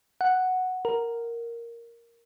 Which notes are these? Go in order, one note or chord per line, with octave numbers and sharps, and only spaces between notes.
F#5
A#4